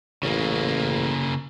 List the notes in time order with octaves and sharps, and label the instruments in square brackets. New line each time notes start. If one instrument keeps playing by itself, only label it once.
[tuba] A1 [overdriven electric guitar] C#3 A#3